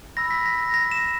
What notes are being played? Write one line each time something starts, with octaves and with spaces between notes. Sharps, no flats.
B5 E6 A#6
B6
A#6
A#6
A#6
E7